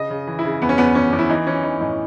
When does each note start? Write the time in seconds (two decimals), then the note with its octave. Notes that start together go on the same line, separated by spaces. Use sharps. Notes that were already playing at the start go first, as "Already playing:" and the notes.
Already playing: C#3 D#5
0.10 C#3
0.27 E3
0.39 E4
0.45 C#3
0.62 E2 B3
0.69 C#4
0.78 E2 B3
0.95 E2 C#4
1.12 E2
1.19 E4
1.29 E3 D#4
1.47 E3 C#4
1.64 E3 D#4
1.81 A2 D#4